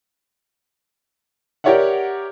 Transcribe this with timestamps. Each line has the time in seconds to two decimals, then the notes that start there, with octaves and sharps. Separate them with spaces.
1.64 G4 A#4 C#5 D5 E5 F#5